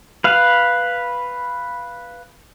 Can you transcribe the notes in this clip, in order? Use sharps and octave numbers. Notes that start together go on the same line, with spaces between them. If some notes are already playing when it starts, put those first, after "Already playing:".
B4 F5